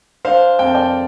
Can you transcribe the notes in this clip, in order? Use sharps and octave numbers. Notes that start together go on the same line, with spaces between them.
D4 C5 F5
F2 G5
A5
D5 G5